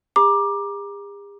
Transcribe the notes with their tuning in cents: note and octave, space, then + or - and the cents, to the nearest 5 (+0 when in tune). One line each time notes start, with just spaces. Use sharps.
G#4 -45 A#5 +30 D6 +10